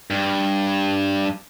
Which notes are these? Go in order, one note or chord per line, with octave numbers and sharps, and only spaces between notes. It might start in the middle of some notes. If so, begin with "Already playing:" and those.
G2